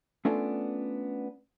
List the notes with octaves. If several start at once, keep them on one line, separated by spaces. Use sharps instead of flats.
A3 B3 C#4 D4 F4 A4